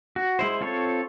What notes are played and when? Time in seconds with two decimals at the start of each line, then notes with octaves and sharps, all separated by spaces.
0.16 F#4
0.39 G#3 E4 C5
0.61 C4 F4 A4 C#5